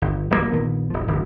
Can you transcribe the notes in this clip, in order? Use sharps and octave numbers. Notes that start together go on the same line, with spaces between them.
G1
D#1 F#2 C3 A#3
A#1 D#3 B3
D#1 F3
D1 G1